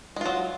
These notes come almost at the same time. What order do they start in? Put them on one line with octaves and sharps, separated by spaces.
G#3 F4 F#3